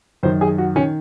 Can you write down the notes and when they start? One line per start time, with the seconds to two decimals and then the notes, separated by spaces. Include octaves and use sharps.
0.23 F#2 D#3 C5
0.41 G#4
0.58 F#4
0.76 D#3 C#4